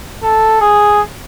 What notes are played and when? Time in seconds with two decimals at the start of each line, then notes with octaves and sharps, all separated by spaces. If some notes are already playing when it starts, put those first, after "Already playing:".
0.23 A4
0.61 G#4